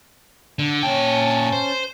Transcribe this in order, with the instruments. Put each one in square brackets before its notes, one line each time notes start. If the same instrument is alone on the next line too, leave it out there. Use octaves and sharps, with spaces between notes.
[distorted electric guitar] D3
[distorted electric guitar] A#2 G5 [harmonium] C#4 A5
[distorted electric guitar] C5